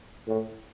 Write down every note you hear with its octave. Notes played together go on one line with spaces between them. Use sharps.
A2